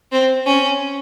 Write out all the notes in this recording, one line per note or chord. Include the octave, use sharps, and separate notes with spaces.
C4
C#4